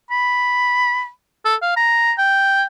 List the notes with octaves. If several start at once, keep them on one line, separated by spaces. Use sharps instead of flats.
B5
A4
F5
A#5
G5